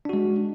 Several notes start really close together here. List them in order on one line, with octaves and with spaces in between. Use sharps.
D4 F#4 G#3